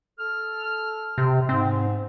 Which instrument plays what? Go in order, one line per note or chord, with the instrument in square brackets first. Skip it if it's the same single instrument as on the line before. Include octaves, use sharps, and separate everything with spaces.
[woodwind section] A4 F6
[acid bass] C3
[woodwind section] G#2 [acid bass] C4